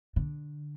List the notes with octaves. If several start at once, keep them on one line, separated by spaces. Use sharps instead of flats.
D3